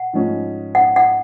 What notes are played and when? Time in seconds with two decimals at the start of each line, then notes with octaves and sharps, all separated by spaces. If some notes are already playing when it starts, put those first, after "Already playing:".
Already playing: F#5
0.13 G#2 F3 G#3 C#4
0.75 F#5
0.96 F#5